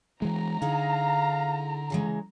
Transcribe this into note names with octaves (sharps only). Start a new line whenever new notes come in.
E3 G#3 A#5
D3 D#4 E4 G#4 F5
C#3 E3 G#3